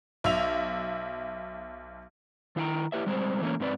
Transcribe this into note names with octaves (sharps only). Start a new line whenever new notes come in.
B1 E5 F7
D#3 E4 F5 G5 A#5
E4 G4 B4 E5
G3 G#3 C4 C5
E3 A3 A#3 C#4
G#2 C4 B4 D5